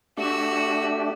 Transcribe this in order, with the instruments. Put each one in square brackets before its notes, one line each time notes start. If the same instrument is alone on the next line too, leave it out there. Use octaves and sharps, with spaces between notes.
[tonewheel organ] A3 D4 G4 [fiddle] F#4 E6